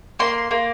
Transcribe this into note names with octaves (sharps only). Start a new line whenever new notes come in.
A#3 C6
A#3